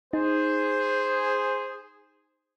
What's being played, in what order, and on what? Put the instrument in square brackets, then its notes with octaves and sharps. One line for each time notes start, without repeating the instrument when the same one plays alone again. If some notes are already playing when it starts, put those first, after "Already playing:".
[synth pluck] D#4 [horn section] G#4 [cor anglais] C5